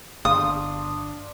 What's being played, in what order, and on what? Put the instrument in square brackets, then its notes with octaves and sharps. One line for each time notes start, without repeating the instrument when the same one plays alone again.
[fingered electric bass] G1 [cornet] D4 [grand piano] F5 C6 [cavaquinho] D#6